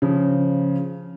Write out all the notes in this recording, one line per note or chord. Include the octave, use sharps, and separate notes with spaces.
C#3 F3